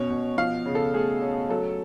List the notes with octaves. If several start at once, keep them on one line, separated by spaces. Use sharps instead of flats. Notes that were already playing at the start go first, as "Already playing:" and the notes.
Already playing: B2 C#4 C#5
B2
F3 F5
C#3
A4
A3 G#4
C#4
F#3 A4